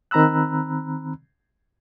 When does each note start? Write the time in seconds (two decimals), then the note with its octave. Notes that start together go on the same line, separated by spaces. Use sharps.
0.11 D#3 C4 A#5 B5 E6 F#6